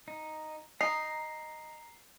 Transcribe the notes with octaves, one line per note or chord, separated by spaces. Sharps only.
D#4
D#4 A#5 C7